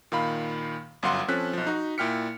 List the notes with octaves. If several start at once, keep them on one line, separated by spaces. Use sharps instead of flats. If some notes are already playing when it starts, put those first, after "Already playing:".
A#2 D#3 F5 B5
G1 F#2 F5 F#5 C6
F3 C4 C#4 A4 F#6 B6
B1 F3
D#4 F#4
A#2 E4 G5 F6 B6 C#7